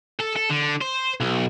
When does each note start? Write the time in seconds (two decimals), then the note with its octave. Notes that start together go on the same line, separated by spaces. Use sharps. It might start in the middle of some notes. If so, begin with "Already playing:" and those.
0.20 A4
0.36 A4
0.50 D3
0.81 C5
1.20 B1